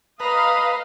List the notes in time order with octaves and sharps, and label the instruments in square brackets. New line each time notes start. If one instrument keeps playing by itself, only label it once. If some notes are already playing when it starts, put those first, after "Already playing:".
[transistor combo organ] B4 [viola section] D#5 F5 [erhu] A#5 [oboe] D#6